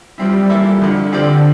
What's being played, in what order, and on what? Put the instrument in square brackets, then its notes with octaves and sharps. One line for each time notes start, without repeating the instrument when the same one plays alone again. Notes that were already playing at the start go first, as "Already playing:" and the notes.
[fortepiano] F3 C4 E4 [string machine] G3
[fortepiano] E3 A#3 E4 A4 E5
F2 D3 F3
[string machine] D3 [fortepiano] F3 C4 G4 D5